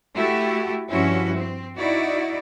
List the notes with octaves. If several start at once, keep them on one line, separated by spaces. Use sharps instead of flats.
A3 E4 F#4 G4
G2 F3 C#4 E4 F#4
C4
D#4 E4 F#4 D5